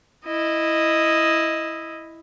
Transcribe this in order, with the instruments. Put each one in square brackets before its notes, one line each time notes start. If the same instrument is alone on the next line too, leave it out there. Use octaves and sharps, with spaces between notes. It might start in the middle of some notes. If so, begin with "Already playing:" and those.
[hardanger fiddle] E4 D#5